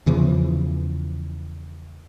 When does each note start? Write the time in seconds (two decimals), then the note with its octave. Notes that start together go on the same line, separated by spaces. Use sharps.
0.06 E2 C#3 E3 F3